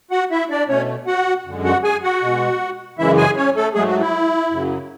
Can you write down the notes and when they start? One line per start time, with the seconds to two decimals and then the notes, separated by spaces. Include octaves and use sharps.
0.11 F#4 F#5
0.31 E4 E5
0.50 D4 D5
0.69 B2 A3 C#4 C#5
1.07 F#4 F#5
1.46 F#2 D3 G#3
1.64 F#4 F#5
1.83 G#4 G#5
2.03 F#4 F#5
2.22 B2 G#3
2.98 F#2 C#3 E3 G#3 E4 E5
3.17 G#4 G#5
3.37 C#4 C#5
3.56 A3 A4
3.74 G#2 F#3 G#3 A3 G#4
3.87 F#4
4.00 E4
4.51 F#2 C#3 F#3